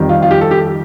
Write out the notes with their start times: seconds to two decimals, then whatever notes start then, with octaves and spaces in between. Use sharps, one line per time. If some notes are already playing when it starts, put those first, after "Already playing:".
Already playing: F2 D#3 G3
0.09 F4
0.22 F4
0.31 G4
0.41 A4
0.51 G4